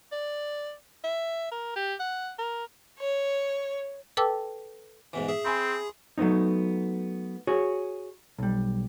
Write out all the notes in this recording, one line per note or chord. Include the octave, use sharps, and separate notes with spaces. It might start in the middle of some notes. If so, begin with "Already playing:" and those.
D5
E5
A#4
G4
F#5
A#4
C#5
A4 B4 G5 A5 D6 E6
G#2 B2 E3
G#4 E5
C4 G#5 B5 C6
F#3 A3 B3 C#4 D#4
F#4 G#4 C#5
B1 G3